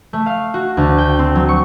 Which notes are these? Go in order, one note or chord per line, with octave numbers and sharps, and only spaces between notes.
A3
F5
F#4
D2
G5
C4
F#3
C#6